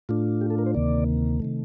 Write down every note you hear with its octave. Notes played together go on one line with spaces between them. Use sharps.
A2 A3 D4 F4
G4
A4
A#4
C5
D2 C3 D#3 A#3 D5
C3 D#3 A3